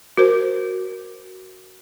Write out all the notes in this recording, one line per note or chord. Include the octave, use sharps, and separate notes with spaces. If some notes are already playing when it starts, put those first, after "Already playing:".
F#4 A#4 C5